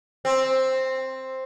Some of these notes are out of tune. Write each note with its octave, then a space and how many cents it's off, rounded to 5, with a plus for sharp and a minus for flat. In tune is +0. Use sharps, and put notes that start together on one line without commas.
C4 +5